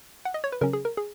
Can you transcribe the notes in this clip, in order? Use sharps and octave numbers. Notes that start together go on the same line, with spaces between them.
F#5
D#5
C#5
B4
C#3 F#3 C#4 A#4
G#4
A#4
G#4